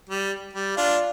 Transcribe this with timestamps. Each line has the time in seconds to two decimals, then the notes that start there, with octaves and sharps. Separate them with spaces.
0.09 G3
0.53 G3
0.77 D4 F4